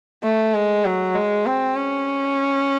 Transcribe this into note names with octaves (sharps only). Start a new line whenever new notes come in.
A3
G#3
F#3
G#3
C4
C#4